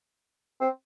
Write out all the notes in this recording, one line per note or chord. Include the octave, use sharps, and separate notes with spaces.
C4